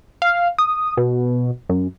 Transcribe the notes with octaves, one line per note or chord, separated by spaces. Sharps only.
F5
D#6
B2
F#2